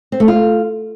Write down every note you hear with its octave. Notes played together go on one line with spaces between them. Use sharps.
C4
A3
F4